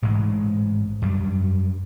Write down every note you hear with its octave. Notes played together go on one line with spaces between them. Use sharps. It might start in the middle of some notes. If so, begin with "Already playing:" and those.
A1 G#2 G#3
F#2 G3